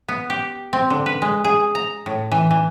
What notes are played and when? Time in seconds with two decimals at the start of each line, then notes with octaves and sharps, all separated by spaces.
0.08 B3
0.30 G4
0.73 C4
0.90 D3
1.06 B4
1.22 G#3
1.44 G#4
1.75 A#5
2.06 A2
2.32 E3
2.51 E3